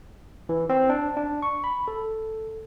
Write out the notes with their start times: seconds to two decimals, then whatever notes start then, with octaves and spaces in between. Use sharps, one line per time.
0.49 E3
0.69 C4
0.89 D4
1.17 D4
1.42 C#6
1.64 B5
1.88 A4